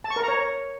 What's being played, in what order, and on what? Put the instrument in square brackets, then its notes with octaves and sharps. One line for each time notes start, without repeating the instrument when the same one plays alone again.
[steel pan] A5
C#6
A#4
A#5
C#5